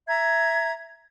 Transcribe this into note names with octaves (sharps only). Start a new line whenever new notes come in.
E5 A#5 G#6